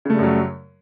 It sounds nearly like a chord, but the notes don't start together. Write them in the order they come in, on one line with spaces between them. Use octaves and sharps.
C#3 A3 G3 F#2 F#3